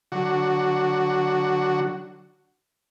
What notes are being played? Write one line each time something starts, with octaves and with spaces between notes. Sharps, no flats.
D3 F#3 F#4